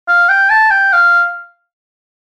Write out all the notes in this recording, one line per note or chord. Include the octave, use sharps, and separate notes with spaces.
F5
G5
A5
G5
F5